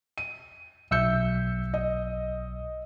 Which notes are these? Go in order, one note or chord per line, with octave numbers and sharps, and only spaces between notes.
D#7
B1 E5 E6 G6 C#7
D#5